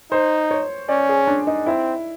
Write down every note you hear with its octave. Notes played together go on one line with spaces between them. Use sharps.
D#4 C5
C#5
C#4 D5
G#4
D4
D#4
C4 E4